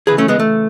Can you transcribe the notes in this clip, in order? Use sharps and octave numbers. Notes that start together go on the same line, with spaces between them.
C#3 E3 G#4 B4
A3 C#4
G#3 B3
A3